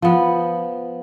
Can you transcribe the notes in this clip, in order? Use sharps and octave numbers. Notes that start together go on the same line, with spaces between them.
F3 B3